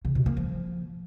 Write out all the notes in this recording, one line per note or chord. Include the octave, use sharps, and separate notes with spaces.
C#3
B2
A#3
F3